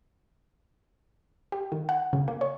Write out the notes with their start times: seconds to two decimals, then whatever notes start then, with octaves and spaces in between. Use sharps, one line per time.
1.52 G4
1.72 D#3
1.89 F#5
2.13 C#3
2.28 A#3
2.41 C#5